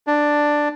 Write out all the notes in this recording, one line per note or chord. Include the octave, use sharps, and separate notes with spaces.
D4